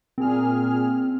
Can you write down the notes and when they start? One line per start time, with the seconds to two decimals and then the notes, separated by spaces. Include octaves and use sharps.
0.18 A#2 C4 G#4 F6